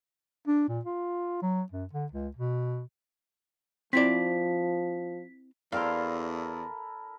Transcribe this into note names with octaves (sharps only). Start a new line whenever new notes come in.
D4
A#2
F4
F#3
F#2
D3
C#2
B2
F3 C4 E4 D5 B6
E2 E4 A4 A#4 C5 D5 F5 G5